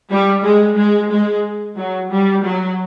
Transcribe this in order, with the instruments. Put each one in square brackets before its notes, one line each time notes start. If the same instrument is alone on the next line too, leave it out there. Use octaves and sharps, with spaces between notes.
[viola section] G3
G#3
G#3
G#3
F#3
G3
F#3